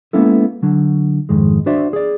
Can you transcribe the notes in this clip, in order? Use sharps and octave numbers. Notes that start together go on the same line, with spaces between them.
G#3 A#3 B3 C#4 E4 A4
D3 F#3
F2 G#2 D#3 G#3
D4 F#4 C5 D5 E5
G#4 D5